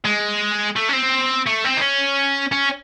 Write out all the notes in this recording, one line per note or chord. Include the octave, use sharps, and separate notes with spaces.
G#3
A3
C#4
C4
A3
C4
D#4
C#4
C#4